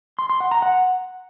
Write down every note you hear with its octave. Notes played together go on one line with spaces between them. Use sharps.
C6
C6
F#5
A#5
F#5